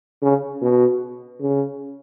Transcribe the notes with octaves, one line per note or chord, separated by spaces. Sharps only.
C#3
B2
C#3